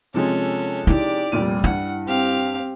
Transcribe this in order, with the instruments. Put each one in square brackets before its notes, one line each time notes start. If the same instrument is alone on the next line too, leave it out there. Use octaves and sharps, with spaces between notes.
[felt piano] C3 F3 G#3 [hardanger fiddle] C#4 A4
[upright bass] D#4 E4 [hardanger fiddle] G4 D5
[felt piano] F1 A#2 D#7 [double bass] G3
[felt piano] G2 [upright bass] E4 [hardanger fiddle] F#5
[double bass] C4 [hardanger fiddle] G4 F5